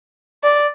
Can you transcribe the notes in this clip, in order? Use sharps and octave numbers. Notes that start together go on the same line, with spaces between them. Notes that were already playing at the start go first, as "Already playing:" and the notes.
D5